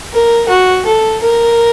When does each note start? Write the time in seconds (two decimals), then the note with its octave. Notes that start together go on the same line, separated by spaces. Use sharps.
0.13 A#4
0.49 F#4
0.86 A4
1.23 A#4